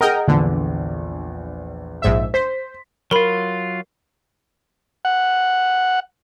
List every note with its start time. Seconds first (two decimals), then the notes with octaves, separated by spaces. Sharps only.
0.01 G#4 A#4 D#5 F#5 G5
0.28 A#1 E2 D3
2.02 A#1 G#2 E5
2.34 C5 B6
3.11 F#3 F4 A#4 B5
5.05 F#5